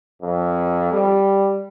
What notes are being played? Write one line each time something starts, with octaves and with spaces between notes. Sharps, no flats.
F2
G3